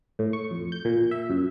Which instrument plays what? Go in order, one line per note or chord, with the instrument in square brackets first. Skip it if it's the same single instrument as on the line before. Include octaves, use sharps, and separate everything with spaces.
[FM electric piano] A2
C#6
F2
G6
A#2
E5
F#2